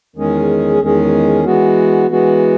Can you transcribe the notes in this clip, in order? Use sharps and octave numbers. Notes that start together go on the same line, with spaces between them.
E2 D#3 G#3 C#4 G#4
E2 D#3 G#3 C#4 G#4
E3 G#3 B3 F#4
E3 G#3 B3 F#4